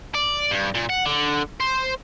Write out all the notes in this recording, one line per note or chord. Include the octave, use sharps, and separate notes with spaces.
D5
G2
A#2
F#5
D3
C5